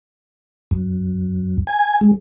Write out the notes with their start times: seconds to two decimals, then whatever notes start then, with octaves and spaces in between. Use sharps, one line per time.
0.71 F#2
1.67 G#5
2.01 G#3